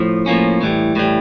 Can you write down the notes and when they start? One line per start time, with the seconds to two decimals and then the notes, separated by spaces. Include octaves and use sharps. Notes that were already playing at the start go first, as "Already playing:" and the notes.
Already playing: A2 F3
0.26 A2 F3 A#3 C#4
0.61 A2 E3 G3
0.96 A2 E3 G3